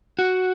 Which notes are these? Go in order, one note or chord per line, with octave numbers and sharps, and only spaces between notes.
F#4